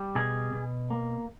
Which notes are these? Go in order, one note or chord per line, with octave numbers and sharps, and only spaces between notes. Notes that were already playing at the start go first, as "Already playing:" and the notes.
Already playing: G3
B2 G#4
B2
A#3